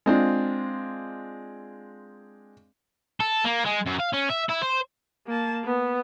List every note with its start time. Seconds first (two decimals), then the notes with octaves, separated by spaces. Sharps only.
0.06 G#3 C4 D4 F4
3.20 A4
3.45 A#3
3.65 G#3
3.86 F#2
4.00 F5
4.14 C#4
4.30 E5
4.49 E4
4.62 C5
5.27 A#3 A5
5.64 B3